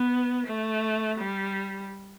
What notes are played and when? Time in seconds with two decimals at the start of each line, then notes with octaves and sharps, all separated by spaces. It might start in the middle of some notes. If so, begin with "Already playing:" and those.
Already playing: B3
0.46 A3
1.18 G3